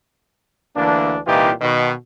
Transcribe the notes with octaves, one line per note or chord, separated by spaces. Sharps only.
D2 E3 A#3 D4
C2 A#2 E3 D#4 F4 G4
B2 D#3